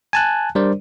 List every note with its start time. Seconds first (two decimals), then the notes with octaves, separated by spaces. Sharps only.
0.13 G#5 A5 F#6
0.55 G3 D4 A#4 C5 D5